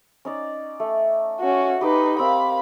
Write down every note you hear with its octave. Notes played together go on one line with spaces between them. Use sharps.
C#4 D#4 D5
A3
C#4 F#4
D#4 G4 B4 D#5 D6
C4 A#4 F5 B5